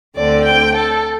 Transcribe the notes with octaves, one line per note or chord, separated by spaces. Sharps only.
D2 D3 C4 D5
G5
A4